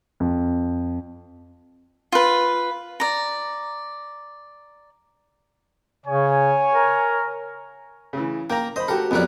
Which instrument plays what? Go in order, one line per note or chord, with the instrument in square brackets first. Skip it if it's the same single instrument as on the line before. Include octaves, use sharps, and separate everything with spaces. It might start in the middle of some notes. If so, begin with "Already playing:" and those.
[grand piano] F2
[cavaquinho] F4 B4
D5 A#5
[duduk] C#3 [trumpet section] C#5 G#5
[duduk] A#4
[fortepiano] C#3 E3
[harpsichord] A#3 [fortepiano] G5 A#5
[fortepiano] C5 B5 [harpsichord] D#5
[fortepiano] F#4 G4 A4 [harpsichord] A#4
[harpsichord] F2 F#3 G3 [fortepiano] B3 A#4 F#6